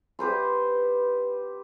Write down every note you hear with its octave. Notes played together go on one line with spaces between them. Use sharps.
G4 B4 C5 C6